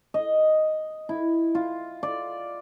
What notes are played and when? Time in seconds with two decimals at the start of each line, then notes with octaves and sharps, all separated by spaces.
0.14 D#5
1.09 E4
1.55 F4
2.03 D5